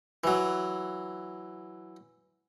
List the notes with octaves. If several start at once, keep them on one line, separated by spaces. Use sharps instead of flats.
E3 F#3